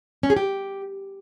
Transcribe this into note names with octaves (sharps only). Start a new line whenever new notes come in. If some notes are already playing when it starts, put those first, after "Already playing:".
C#4
G#4
G4